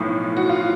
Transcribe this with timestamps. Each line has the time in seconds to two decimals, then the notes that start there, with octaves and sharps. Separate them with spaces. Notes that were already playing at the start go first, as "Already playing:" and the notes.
Already playing: B1 A2 F3
0.37 F#4
0.49 F4